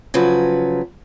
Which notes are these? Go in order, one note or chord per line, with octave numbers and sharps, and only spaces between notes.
C#3 F3 F#3 B4